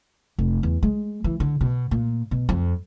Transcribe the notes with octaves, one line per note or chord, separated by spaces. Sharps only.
F1
E2
G#3
E3
D3
B2
A#2
B2
F2